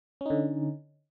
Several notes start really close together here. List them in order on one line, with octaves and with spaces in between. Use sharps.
C#4 D#4 D3